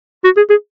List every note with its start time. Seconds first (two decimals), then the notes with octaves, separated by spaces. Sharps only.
0.24 F#4
0.37 G#4
0.50 G#4